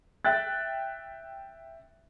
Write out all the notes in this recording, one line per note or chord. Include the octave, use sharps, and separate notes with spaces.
E5 G5 F#6 A6